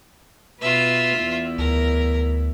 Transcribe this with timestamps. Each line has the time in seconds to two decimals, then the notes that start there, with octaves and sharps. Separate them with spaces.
0.61 B2 F4 B4 E5
1.19 E2 E4
1.58 D2 A#4